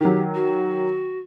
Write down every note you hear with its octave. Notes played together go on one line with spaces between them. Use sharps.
D#3 F#3 G4
F#4